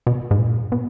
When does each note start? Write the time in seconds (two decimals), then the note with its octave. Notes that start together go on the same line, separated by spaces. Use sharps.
0.07 B2
0.31 G#2
0.39 A#2
0.72 B2